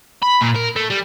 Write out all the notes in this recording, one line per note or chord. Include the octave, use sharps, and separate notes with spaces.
B5
A#2
A#4
A3
G3